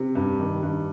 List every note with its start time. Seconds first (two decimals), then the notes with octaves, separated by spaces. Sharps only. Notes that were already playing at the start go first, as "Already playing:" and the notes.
Already playing: C3
0.15 G2
0.40 D#3
0.63 G2